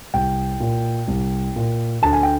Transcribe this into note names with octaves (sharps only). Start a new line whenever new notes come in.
C2 G5
A#2
C2
A#2
D2 A5
G#5
G5